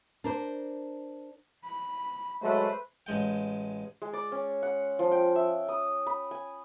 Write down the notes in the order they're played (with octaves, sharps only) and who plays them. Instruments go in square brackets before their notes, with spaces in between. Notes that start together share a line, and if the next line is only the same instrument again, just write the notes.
[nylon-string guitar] D4 A#4 C5
[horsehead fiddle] B5
[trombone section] F#3 G#3 A3 [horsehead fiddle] B4 C5
[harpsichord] A1 G#3 G5
[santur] G#3
D5
C#4
F#5
F3
G5
E5
D#6
B5
G#5